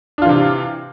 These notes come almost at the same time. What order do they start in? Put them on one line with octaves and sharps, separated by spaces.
D4 F4 E3 C3